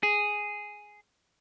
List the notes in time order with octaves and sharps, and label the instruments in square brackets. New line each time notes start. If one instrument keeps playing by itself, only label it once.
[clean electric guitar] G#4